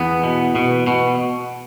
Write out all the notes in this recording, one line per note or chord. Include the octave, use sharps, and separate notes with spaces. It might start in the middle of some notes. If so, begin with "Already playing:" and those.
Already playing: E2 B3
B2
B2
B2